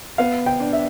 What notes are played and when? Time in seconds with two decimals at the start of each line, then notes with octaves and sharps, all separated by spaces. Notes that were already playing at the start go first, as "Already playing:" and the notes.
0.18 B3 F5
0.46 G5
0.60 D4
0.73 E5